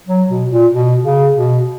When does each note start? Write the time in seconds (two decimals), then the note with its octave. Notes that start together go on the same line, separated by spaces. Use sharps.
0.07 F#3
0.29 B2
0.51 A#2
0.72 B2
1.04 C#3
1.36 B2